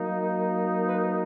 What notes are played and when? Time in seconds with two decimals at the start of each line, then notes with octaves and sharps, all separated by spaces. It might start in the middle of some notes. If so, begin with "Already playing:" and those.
Already playing: F#3 A#3 D#4
0.86 B4